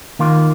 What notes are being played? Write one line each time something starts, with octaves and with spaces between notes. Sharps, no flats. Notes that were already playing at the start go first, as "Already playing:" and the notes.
D#2 D#3 A#3 F4